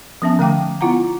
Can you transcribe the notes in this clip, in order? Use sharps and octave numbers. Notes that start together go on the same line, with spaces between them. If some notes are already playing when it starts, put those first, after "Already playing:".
F3 B3 C#4 E5 A5
D3 A3 G5 D6
B3 E4 F4 F#5 A#5